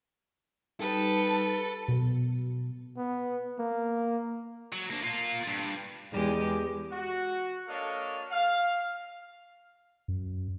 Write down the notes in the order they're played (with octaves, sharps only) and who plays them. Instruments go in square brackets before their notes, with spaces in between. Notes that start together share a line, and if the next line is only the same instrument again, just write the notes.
[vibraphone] G3 D#4 G4 [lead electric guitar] A4 [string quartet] B4
[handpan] B2
[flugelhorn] B3
A#3
[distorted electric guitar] F#3
A#3 D4
A#3 F4
G2
[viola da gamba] E2 G#3 G4
[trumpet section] F#4
A#3 D4 A4 C#5 D#5 F5
F5
[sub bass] F#2